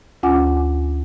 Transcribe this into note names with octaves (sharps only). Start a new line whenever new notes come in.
D2 C#4 F4 F#5 G#5 D6